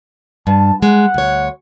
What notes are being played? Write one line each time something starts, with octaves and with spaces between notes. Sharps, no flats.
G2 A5
G#3 F#5
D2 C#5